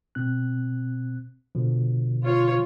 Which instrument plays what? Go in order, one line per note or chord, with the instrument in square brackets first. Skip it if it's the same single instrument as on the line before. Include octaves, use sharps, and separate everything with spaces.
[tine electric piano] B2 C4 F#6
B2 D3 F3
[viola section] F4 C#5